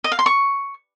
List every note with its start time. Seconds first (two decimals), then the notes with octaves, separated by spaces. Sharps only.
0.04 D#5
0.12 F5
0.19 C6
0.26 C#6